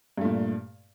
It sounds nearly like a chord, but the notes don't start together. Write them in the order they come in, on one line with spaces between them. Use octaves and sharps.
G2 A3 A#2